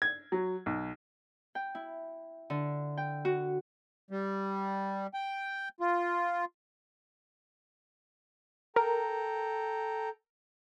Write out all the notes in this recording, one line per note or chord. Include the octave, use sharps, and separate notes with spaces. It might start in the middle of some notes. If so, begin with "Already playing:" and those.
G#6
F#3
B1
G5
E4
D3
G5
F#4
G3
G5
F4
A4 A#4 G5 A#5